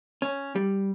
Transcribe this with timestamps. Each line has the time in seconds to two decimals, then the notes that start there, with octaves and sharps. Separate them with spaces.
0.22 C#4
0.56 G3